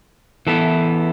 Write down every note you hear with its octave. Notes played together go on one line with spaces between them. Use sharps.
E3 B3 E4 A4